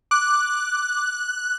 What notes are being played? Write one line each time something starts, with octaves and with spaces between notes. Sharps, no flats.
D6 F#6